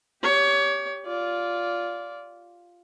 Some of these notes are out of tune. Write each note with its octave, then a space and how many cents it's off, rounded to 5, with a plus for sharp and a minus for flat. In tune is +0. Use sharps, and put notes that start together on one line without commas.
G4 +0 C#5 +25
F4 +0 D5 -20